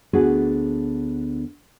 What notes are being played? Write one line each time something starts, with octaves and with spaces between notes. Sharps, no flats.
D2 B3 D4 F#4 G#4